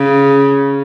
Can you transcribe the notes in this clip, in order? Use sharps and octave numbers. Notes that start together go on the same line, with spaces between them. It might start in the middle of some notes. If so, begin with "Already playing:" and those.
Already playing: C#3